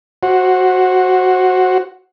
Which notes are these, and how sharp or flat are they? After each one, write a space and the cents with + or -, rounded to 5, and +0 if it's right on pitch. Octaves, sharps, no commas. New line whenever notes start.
F#4 +0 C5 +15